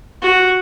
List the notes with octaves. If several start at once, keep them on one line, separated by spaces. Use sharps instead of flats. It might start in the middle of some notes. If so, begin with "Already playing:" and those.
F#4